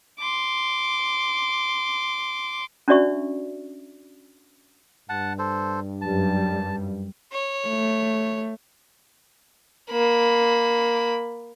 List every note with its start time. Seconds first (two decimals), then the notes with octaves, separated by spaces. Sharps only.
0.19 C6 D6
2.88 C#4 D4 F#4 D5 E5 C#6
5.09 G2 F#5 A5
5.39 A4 C5
6.01 F#2 G3 A5
7.32 C#5
7.68 A3
9.91 A#3 B5